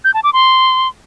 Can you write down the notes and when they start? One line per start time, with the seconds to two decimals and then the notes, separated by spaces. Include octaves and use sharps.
0.04 G6
0.14 A5
0.24 D6
0.33 C6